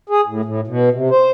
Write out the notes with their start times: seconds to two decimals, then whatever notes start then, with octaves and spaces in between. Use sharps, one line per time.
0.09 G#4
0.27 A2
0.45 A2
0.67 B2
0.93 C3
1.10 C5